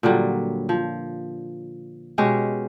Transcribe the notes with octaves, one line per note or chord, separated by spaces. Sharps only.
A#2 D3 F#3 G3
F3
B2 G#3 C#4 G4